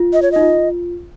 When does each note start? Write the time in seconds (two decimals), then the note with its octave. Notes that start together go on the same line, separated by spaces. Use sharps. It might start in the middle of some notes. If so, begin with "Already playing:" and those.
Already playing: F4
0.13 D#5
0.22 C#5
0.32 D#4 D#5
0.41 F4